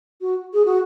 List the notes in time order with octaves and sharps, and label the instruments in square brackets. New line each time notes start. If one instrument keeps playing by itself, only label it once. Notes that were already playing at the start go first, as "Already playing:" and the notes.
[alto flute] F#4
G#4
F#4